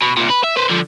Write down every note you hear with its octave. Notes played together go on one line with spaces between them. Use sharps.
B2
C2 A#2
B4
E5
B4 C5
D3 F3